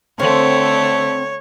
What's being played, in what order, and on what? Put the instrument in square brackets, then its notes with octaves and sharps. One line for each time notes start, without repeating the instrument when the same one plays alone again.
[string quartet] D3 A3 [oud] C4 F5 [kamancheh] C#5